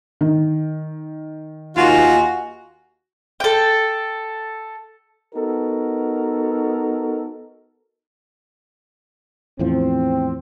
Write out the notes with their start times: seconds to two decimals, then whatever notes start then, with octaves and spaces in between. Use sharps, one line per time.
0.21 D#3
1.77 D#2 D#4 F4 F#4 G#5
3.40 A4 G5
5.35 B3 D#4 F#4 A4 A#4
9.59 E2 A2 F3 C4